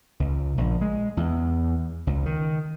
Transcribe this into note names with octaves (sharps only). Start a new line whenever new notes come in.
C#2
A#1
G#3
E2
C#2
D#3